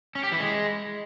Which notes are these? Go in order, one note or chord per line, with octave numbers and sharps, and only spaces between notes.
C#4
G4
E3
G#3